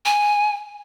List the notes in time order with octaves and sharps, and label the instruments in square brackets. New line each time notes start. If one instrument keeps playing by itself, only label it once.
[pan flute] G#5